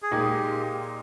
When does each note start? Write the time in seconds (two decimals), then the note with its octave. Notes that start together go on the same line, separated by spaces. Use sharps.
0.02 G#4
0.11 A#2 G#3 D#4 G4